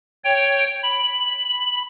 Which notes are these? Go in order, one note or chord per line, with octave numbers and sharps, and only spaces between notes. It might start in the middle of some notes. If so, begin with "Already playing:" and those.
C#5 G5
B5